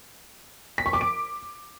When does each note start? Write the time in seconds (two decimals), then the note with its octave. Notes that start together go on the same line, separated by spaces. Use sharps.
0.78 B6
0.86 C#6
0.93 D6
1.01 D7